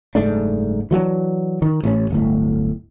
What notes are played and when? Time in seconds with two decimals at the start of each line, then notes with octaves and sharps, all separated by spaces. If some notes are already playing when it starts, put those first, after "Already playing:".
0.15 F#1 G#2 A3 D4
0.91 E3 F#3 A3 D4
1.62 D#3
1.83 A1 A2 C#4
2.10 D1 G1 A2